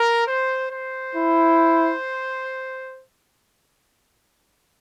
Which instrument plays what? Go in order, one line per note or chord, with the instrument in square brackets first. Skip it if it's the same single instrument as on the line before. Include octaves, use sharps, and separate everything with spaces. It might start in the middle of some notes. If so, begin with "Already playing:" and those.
Already playing: [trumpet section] A#4
C5
C5
[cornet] E4